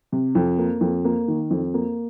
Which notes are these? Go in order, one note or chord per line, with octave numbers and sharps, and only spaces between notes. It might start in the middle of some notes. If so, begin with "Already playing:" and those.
C3
F2
A#3
F2
A#3
D#3
F2
A#3